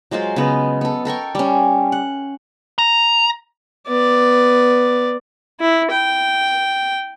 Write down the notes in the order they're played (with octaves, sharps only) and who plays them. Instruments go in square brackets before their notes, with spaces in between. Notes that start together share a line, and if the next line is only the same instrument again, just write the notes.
[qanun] F#3 G#3 F4 C5
C#3 B3 D#5
B3 A4
A4 A#4 G5 C#6
G3 C#4
F#5
[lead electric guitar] A#5
[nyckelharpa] B3 D5
E4
G5